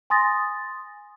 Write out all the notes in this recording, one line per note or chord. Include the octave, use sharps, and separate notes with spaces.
G#5 C6 D#6 A6 A#6